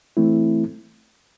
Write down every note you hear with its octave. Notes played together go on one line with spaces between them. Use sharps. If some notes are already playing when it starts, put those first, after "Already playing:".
E3 A3 C4 E4